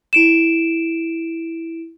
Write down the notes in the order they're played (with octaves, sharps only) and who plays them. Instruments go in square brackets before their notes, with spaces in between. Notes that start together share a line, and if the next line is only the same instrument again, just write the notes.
[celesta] E4 D7 E7